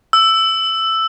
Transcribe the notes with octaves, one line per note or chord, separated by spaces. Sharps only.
E6